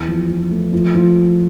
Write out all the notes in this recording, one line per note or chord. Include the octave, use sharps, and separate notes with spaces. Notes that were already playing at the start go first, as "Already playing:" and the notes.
Already playing: E2
F3
F3
A3
F3
F3